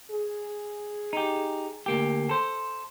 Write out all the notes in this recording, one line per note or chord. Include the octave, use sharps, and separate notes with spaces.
G#4
D#4 G4
D2 A#3 G4
A4 C5